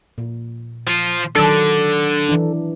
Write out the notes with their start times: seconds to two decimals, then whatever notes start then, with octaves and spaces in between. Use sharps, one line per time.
0.18 A#2
0.87 F3 F4
1.35 D3 D#3 F#3 D4 A4
2.29 E3 D4